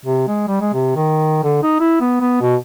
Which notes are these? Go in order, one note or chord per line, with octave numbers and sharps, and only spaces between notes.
C3
G#3
G3
G#3
C3
D#3
D3
D#4
E4
B3
B3
B2